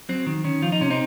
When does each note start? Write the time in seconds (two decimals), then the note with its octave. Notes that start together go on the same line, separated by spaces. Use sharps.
0.09 F#3 C4
0.26 D#3
0.44 D#3 C#4
0.62 F3 F4
0.72 D#4
0.81 C3 C#4
0.90 C4 D#4